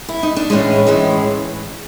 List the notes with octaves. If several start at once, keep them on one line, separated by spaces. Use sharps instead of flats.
E4
D#4
D4
A2 E3 G#3 C#4
A2 E3 G#3